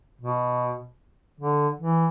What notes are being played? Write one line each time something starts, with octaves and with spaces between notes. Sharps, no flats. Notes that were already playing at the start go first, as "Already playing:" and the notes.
B2
D3
E3